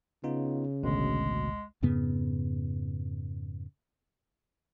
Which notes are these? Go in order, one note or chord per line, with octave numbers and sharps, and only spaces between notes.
C#3 B3 D#4 F4
A1 D2 B2 G#3
F2 G#2 C#3 B3